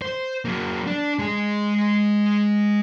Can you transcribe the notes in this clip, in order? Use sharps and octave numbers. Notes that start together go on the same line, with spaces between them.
C5
F#3 A#3
D4
G#3 G#4